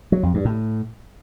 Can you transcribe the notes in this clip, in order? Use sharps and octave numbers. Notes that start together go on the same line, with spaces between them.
F#3
F2
G2
A2